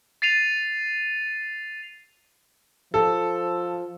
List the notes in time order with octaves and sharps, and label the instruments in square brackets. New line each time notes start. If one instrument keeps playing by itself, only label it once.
[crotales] A6 C7 D#7 F7
[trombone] F3 [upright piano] A4